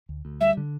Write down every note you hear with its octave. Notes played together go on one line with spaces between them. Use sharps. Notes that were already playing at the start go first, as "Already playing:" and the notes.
D2
D2
G3 E5
D3